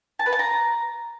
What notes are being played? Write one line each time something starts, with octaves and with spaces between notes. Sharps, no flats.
A5
B4
A5
A#5